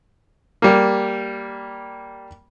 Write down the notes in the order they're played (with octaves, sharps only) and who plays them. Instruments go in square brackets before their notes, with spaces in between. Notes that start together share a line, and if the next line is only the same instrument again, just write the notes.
[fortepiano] G3 A#3